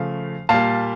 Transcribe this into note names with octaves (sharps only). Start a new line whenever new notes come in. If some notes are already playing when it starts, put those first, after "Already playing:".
Already playing: C#3 F3 A3 F5
A#2 G3 F5 A5